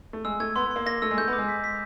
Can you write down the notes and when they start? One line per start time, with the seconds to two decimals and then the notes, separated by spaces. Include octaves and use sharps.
0.13 A3
0.25 G#3 E6
0.40 A3 G#6
0.56 B3 C6
0.66 B3
0.71 A#3 C6
0.86 A#3 A#6
1.02 A3 E6
1.11 G#3
1.17 A3 G6
1.28 B3
1.33 D6
1.38 G#3
1.48 B6
1.64 B6